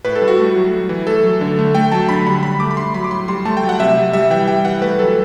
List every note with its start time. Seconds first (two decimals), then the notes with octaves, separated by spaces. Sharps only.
0.05 A2 B4
0.16 A4
0.22 G3
0.28 F#4
0.39 A3
0.56 F#3
0.73 G3
0.89 E3
1.07 A3 A4
1.24 F#3
1.41 D3
1.59 A3
1.75 A3 G5
1.92 F#3 A5
2.09 D3 B5
2.27 G3 B5
2.43 D3 B5
2.60 A3 D6
2.71 B5
2.77 A3 C6
2.94 F#3 B5
3.04 D6
3.11 A2 C6
3.28 G3 C6
3.45 A3 A5
3.57 G5
3.63 F#3
3.69 F#5
3.80 C3 E5
3.97 G3
4.13 G3 E5
4.30 E3 G5
4.47 G3 G5
4.65 E3 F#5
4.82 A3 B4
4.99 F#3 A4